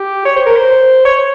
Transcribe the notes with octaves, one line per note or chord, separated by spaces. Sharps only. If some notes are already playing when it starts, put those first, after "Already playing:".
Already playing: G4
C#5
C5
A#4
C5
C#5